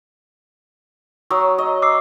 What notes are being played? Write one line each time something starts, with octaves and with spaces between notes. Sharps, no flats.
F#3 C#6 D#6
D#5
D6 E6 C7